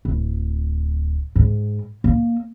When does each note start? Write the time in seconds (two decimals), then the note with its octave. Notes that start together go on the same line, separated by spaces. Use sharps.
0.05 D1
1.36 G#2
2.04 A#3